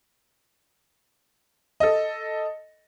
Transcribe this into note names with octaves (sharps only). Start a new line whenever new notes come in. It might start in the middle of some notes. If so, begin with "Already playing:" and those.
A4 D#5